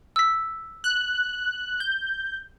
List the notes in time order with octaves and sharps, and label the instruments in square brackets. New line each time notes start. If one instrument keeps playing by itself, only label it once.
[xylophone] E6 B6
[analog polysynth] F#6
G6